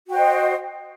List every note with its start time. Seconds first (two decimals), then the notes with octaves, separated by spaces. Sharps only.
0.07 F#4
0.10 G5
0.13 C5
0.15 D#5